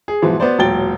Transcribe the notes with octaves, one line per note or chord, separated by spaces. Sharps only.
G#4
G#2 B2 E3 F3
B3 F#4 C5 D5
E1 A#2 F#3 G5 A6 G7